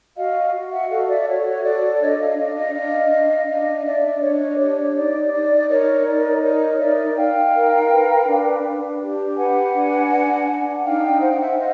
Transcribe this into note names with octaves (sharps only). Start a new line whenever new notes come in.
F#4 D#5 F5
F#4
E5 F#5
A4 D#5 F5
D5 E5
D5
F#4 C#5
A4 D5
D4 C#5 D#5
D#5 F5
D4 D#5 F5
D#5 F5
D4 D#5 F5
D4
D4 D#5 F5
F5
D4 D5 E5
D4 C#5 D#5
G4 C#5
C#5
D#4 D5
D#4 D5
A#4 C#5 D#5
D#4 D5
A#4 C#5 D#5
D#4 D5 E5
D#4 F5 G5
A#4
B4
D4
D4
G4
B4 F#5 G#5
D4
D4
D4
D#4 F5 G5
C5 F#5
G5
E5 F#5
D#5 F5